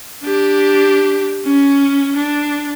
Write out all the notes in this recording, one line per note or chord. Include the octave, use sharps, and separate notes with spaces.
D4 G4
C#4
D4